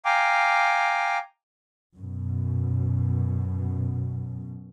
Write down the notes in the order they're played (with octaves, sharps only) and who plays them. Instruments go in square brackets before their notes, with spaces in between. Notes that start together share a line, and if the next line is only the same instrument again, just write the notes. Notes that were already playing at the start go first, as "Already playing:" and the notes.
[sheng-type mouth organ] F5 G5 G#5 A#5 D6
[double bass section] F#2 B2